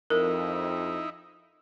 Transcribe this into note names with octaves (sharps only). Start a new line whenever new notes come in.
F2 D#4 E4 A#4